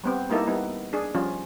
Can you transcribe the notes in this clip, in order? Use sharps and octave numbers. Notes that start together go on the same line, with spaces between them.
G3 B3 C4
G3 A#3 D#4 E4 A4
G3 B3 D#4
D4 G#4
F3 G3 C#4 F4